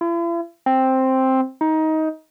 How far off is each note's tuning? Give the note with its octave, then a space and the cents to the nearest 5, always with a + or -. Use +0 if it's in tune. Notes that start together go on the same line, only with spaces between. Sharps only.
E4 +45
C4 +5
D#4 +20